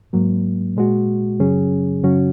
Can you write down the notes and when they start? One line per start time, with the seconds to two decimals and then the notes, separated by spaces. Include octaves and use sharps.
0.13 G#2 F#3 A#3
0.77 A#2 G#3 F#4
1.40 F#2 C#3 F#3 C#4 G#4
2.03 F#2 C#3 F#3 C#4 F#4